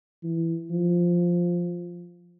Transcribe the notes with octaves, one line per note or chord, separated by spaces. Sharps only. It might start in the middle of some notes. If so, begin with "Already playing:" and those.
E3
F3